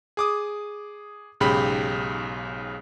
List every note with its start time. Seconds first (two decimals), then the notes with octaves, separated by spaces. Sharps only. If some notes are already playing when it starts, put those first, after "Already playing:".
0.17 G#4 D6 D#6
1.41 B1 G#2 C#3 G4 B5